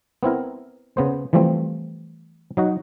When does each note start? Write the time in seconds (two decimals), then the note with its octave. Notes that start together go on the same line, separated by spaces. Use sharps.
0.23 B3 C4 E4 A#4
0.97 C#3 B3 C5
1.33 E3 F3 G3 A3 C4
2.57 F#3 D#4 F#4